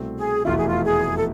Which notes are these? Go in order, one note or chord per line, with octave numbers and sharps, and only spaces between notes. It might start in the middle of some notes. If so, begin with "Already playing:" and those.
Already playing: C2 B2 A3 C4
G#4
F1 E2 B2 A3 E4 F4
G#4
F4
G#4
A4